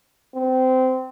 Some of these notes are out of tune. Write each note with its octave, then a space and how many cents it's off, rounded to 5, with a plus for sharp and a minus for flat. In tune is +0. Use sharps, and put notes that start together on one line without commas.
C4 -20